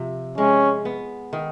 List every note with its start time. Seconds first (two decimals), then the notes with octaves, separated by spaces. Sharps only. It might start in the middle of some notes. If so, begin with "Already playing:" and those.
Already playing: C3 F3
0.38 G#3 C#4
0.85 B3
1.33 D#3